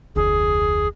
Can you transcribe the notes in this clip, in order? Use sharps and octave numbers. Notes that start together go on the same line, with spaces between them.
F1 D2 G#4